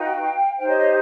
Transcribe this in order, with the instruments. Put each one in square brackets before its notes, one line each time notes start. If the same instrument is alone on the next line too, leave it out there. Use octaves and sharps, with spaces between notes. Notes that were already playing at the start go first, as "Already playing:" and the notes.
Already playing: [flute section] D#4 F#4 B4 F5 G5
D#4 G4 C5 F5 G5
C#5 D#5
C#5 D#5